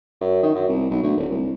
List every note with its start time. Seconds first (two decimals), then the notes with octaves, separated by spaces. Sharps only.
0.21 F#2
0.43 D#3
0.55 F#2
0.69 C2
0.90 B1
1.03 D2
1.17 D1
1.30 C2